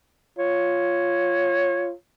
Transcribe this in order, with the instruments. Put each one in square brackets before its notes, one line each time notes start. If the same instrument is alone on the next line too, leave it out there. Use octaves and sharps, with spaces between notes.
[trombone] F4 [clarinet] C#5